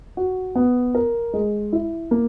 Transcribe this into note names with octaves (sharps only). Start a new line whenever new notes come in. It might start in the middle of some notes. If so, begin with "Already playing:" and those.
F#4
B3
A#4
G#3
E4
A#3